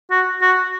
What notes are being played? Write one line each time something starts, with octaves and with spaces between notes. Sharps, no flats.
F#4
F#4